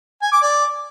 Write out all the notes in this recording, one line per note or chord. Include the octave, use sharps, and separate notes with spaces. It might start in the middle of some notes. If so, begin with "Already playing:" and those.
G#5
D6
D5